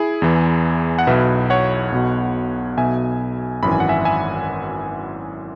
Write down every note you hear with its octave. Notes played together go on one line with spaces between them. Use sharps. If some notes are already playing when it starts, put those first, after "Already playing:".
Already playing: E4 G#4
E2 E3
F#5
B1 B2 B4 E5
C#5 F#5
B1 B2
B1 B2 E5 G#5
G#1 F#2 E3 B5
G#5
F#5
E5 G#5
E5 G#5